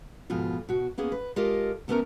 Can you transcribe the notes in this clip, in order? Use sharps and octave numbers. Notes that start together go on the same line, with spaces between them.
F2 G#2 B2 F4
B2 F#4
A#3 B3 C#4 G#4
B4
G#3 F4 G4 A4 A#4 D#5
D2 A3 B3 C#4 A#4 A#5